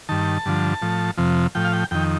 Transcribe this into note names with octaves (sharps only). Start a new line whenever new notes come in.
G2 D#3 A5
G2 D3 F3
A2 F3
F2 C3 F3
A2 F3 G5
F5
G5
F2 D#3 G5